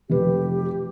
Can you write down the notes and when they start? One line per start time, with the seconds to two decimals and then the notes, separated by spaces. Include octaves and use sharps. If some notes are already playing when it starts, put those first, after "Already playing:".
0.10 F1 G4 B4